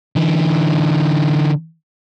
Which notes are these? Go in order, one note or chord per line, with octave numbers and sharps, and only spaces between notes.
D3 E3